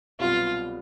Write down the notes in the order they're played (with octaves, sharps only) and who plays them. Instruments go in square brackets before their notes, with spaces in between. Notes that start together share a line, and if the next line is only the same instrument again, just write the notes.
[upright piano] C2 B2 F#3 B3 [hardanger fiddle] F4